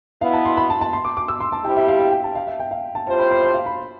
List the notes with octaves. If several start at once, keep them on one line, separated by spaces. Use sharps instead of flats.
B2 B3 E4 F5
A5
C6
B5
A5
A5
C6
D6
D6
E6
C6
A5
C3 G3 C4 E4 G4 G5
E5
F5
F5
G5
A5
F5
E5
G5
F5
A5
A2 G3 C4 F4 C5 A5
B5
B5
C6
F5
B5